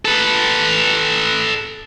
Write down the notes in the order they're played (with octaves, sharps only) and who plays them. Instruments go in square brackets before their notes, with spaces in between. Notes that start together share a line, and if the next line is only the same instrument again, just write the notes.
[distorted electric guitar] A4 B4